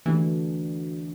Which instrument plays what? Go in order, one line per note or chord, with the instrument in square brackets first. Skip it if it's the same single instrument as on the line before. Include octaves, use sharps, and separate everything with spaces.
[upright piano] D2 D3 A3 D4 F#4 [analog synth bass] E3